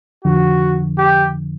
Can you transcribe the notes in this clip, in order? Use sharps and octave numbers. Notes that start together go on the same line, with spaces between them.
F2 D3 F3 F#4
G4